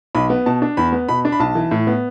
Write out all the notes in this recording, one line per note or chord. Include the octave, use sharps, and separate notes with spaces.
B1 B5
B3
B2 A5
D4
E2 B5
B3
B2 B5
D4
B5
B1 A5
E3
A2
B3